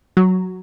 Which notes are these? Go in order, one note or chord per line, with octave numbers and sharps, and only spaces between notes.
F#3